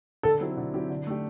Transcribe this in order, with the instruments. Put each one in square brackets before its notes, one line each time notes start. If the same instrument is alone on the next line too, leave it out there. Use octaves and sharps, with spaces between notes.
[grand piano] D3 [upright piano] A4
[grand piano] F#3 C4 E4 G4
D3
F#3 C4 E4 G4
D3
A3 D4 G4